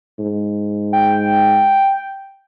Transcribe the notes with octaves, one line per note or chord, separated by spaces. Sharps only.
G#2
G5